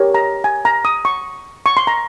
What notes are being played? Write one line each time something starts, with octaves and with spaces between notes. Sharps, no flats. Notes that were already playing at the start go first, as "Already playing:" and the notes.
Already playing: G4 A#4 C#5
A#5
G#5
A#5
D#6
C#6
C#6
C6
A#5